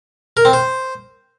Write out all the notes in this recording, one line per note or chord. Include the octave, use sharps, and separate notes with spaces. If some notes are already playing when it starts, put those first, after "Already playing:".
A#4
C4
C5